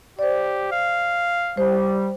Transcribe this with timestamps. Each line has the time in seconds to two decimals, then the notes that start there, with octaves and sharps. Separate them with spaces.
0.19 G4 C5 D5
0.72 F5
1.57 G3 C5